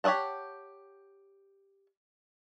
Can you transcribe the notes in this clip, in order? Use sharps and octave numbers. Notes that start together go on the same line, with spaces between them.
G4 C#5 D#5 F#5 A5